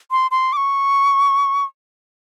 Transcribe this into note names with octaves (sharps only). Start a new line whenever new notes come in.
C6
C6
D6
C#6